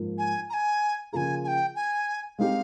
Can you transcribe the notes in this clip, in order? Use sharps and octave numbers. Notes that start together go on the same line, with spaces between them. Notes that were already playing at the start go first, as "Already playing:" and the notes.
Already playing: G#2 F3 A#3
G#5
A#5
G#5
C#3 F3 A#3 F4 G#4 G#5 A#5
G#5
G5
G#5
G#3 C4 D#4 G4 F5